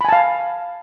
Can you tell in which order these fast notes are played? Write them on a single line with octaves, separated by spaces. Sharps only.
B5 G#5 A5 F5